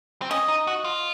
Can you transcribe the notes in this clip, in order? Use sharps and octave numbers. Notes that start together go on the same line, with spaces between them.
C4
C#4 D#5
D#4
F#4
F4